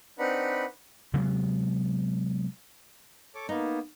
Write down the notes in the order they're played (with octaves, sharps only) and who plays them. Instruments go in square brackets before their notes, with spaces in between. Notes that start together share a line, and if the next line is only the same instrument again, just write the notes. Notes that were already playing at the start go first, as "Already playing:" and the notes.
[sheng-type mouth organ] C4 D4 D#4 B4 F#5 B5
[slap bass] C3 F#3 G#3 B3
[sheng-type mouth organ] A4 C#5 D6
[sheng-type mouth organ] A#3 B3 [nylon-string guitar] D#4